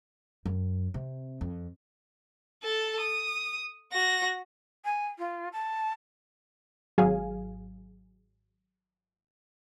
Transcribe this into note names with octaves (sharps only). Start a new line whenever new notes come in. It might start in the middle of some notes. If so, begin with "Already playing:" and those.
F#2
C3
F2
A4 A5
D#6
F#4 A#6
G#5
F4
A5
G#1 F#3 G#4 F5 G#5